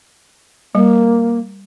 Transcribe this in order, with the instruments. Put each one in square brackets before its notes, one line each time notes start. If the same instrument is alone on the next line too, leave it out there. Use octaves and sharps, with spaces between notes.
[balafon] G3 [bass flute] A#3